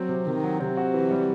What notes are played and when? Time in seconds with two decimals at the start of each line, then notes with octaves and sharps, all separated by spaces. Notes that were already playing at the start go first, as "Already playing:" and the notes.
Already playing: F#3 C4
0.09 C3
0.26 C3 D#3
0.44 F#3
0.60 C3 C4
0.77 F#4
0.94 E3
1.11 G3